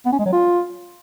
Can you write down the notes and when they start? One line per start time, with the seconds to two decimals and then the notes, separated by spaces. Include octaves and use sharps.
0.06 B3
0.12 C#4
0.19 G#3
0.26 F#3
0.33 F4